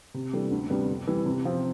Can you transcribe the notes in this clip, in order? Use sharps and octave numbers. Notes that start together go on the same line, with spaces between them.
C3
E3 G3 D4 A4
D2
C3 G3 B3 D4
F2
E3 G3
C3
F3 C4